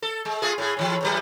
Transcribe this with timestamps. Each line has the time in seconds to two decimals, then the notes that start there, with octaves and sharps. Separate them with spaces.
0.02 A4
0.25 G#3
0.42 A3 F4 G#4
0.58 A2 G#4
0.77 A2 C#3 E3
1.01 E2 A2 F#3